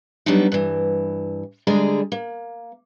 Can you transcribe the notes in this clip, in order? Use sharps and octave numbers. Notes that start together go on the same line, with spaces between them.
F#3 G3 B3 D4 D#4
G2 E3
D3 G3 G#3 G#4 D5 A#5
A#3